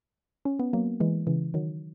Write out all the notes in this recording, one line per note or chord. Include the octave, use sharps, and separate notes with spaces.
C#4
B3
F#3 A#3
E3 G#3
C#3 E3
D#3 F#3